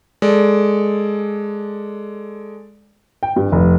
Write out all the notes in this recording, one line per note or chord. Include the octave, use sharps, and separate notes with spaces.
G#3 A4 D5
G5
G2
F1